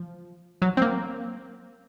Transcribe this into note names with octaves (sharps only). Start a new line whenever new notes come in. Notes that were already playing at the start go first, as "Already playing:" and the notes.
Already playing: F3
F#3
C4
A#3